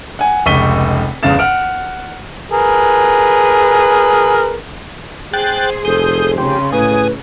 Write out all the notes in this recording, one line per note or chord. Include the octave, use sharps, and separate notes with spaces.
F#5 G#5
F1 C#2 C#6 B6 D#7 G7
G1 E2 C#3 F5 A6 E7
F#5 F6 D7
G#4 A#4 B4
G#4 C5 G5 F#6 A6
F1 A4 D#6 G6
C#3 G4 C6
A2 B4 G#5 D#6